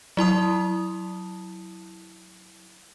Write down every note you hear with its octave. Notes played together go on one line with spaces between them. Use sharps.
F#3 E4 A5 D#6